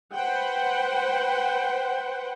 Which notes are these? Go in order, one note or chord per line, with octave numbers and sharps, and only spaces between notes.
B4 C5 F#5 G5